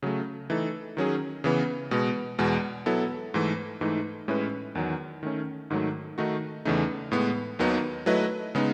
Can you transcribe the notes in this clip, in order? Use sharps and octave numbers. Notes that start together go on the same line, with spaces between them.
C#3 F#3 A3
E3 A3 D#4 A4
D#3 F#3 C#4 G#4
C#3 E3 B3
B2 G#3 B3
E2 B2 G#3
F#3 B3 E4 A4
G#2 E3 A3
G#2 E3 A3 D#4
A2 G#3 C#4 E4 B4
E2 D#3 F#3
D#3 A3 C#4
G#2 D#3 F#3 A3
D#3 A3 D#4 F#4
E2 C#3 E3 A3 D#4
A2 G#3 B3
D#2 D#3 F#3 B3 D#4
F#3 A3 E4 B4 D#5
C#3 G#3 B3 D#4